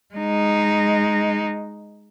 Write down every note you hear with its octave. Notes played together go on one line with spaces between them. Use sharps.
G#3 D#4